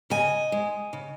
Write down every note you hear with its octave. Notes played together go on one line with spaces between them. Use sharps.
C#3 D#5 G#5
G#3
C#3